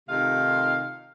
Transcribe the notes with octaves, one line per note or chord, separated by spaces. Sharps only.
C3 D#3 A3 D#4 F4 F5